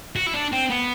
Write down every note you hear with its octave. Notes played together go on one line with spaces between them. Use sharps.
F#4
E4
D4
C4
B3